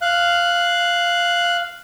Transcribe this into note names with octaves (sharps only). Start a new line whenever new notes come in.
F5 F#6